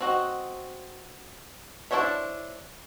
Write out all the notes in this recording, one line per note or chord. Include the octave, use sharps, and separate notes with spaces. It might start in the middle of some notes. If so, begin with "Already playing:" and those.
C4 F#4 D#5
D4 E4 C5 C#5 E5